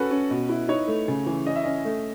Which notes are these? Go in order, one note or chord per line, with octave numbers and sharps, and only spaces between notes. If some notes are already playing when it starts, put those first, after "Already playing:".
Already playing: C#4 F#4 A4 B4
C#4
B2
E4
D#4 C#5
A3
C#3
E3
C#4 D#5
E5
C#4 D#5
A3